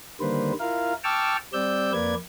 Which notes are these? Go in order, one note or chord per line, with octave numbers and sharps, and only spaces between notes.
D3 D#3 G3 A#3 B4 C5
E4 F4 A#4 F5
G5 A5 C#6 D6 E6 F6
G3 C4 D5 E6 G6
F2 A#3 B4 D5 G#6